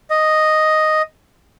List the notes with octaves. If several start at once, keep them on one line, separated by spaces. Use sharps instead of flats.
D#5